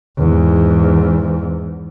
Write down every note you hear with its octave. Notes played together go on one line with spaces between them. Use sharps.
E2 G#2